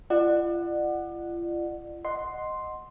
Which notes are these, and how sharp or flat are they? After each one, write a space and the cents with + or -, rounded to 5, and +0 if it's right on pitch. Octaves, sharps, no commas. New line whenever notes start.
F4 -40 D5 +35 F#5 +0
D#5 -5 F#5 +0 C6 +0